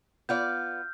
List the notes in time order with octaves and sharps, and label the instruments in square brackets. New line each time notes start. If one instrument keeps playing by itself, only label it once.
[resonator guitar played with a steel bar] B3 F4 D5 [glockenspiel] F6 G6